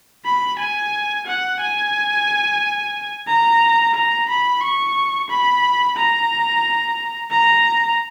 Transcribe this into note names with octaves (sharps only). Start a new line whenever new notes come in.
B5
G#5
F#5
G#5
A#5
A#5
B5
C#6
B5
A#5
A#5